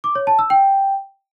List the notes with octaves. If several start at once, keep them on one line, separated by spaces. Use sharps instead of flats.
D6
C#5
A5
E6
G5